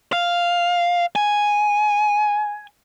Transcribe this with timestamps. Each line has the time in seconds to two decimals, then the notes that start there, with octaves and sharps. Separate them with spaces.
0.13 F5
1.16 G#5